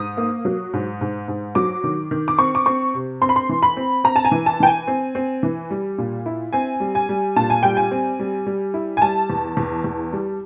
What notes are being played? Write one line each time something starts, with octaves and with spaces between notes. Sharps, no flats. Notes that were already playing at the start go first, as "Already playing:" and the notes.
Already playing: G#2 D#6
A#3
F#3
G#2
G#2
G#2
F#3 D6
D#3
D#3
D6
C4 C#6
D6
C4 C#6
C3
C4 C6
B5
C6
E3
B5
C4
C4 A#5
A5
G#5
E3
A5
E3 G5
G#5
C4
C4
E3
G3
A#2
E4
C4 G#5
G3
G#5
G3
A#2 A5
G#5
G3 G5
G#5
C4
G3
G3
E4
G#5
G3 A5
E2
E2
E2
G3